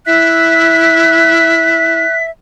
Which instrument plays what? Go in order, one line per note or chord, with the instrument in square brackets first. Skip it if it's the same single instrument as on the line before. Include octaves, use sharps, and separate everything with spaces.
[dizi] E4 [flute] E5 [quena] F#6 [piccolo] B6